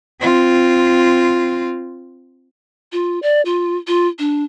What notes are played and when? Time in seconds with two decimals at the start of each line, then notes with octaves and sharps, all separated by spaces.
0.21 C4 F4
2.92 F4
3.22 D5
3.45 F4
3.87 F4
4.19 D4